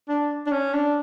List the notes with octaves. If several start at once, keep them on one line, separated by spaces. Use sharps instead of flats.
D4
D4
C#4
D4